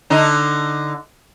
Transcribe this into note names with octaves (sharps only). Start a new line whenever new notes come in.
D3 D#4